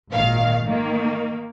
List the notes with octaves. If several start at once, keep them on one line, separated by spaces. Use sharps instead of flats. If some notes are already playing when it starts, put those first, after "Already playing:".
G#1 A#2 D#3 F5
D#3 A#3